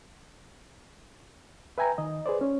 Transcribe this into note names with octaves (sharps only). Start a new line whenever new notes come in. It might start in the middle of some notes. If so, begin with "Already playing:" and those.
B4 E5 G5 G#5 A#5
D#3 D#5
G#4 B4 C5 D5
C#4 C#5